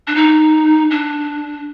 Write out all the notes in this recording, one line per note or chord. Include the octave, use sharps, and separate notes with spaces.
D4
D#4
D4